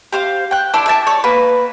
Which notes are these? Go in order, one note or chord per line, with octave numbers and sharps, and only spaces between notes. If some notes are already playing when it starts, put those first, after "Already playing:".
G4 C5 F5
G5 F#6
D4 E4 C6 D6
E5 G#5 A5 D6
C#5 D5
A#3 B4